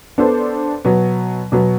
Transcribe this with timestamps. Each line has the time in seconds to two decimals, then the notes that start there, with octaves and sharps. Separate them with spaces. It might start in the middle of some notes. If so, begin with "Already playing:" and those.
0.18 B3 D4 A4 C5
0.85 B2 F#3 B3
1.52 B2 F#3 B3